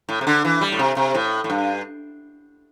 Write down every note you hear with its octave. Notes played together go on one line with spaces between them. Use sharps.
A2
C3
D3
E3
G3
A2
C3
C3
A2
A2
G2